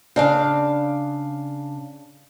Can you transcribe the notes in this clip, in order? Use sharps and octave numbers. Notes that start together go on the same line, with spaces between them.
C#3 D4 F5